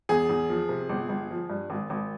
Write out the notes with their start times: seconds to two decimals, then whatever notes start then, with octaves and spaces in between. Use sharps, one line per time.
0.09 E2 G#4
0.29 E2
0.50 F3
0.69 C3
0.90 G1
1.09 G1
1.31 F3
1.50 G2
1.70 G#1
1.90 G#1